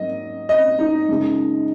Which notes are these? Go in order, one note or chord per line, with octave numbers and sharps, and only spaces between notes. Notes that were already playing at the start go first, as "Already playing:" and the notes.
Already playing: G#2 F#3 A#3 D#5
D#5
D#4
F#2 C#3 G#3